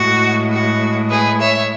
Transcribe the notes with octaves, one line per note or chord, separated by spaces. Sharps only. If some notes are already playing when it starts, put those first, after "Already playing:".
Already playing: A2 G#3 F#4
F#4
G#4 B4
C#5 E5